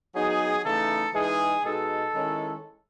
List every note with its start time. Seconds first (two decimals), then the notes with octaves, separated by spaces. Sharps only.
0.14 F#3 B3 D#4 G#4
0.64 C#3 E3 A3 D#4 A4
1.14 E3 G#3 D#4 G#4
1.64 B2 G#3 D#4 A4
2.14 D#3 G#3 C#4 E4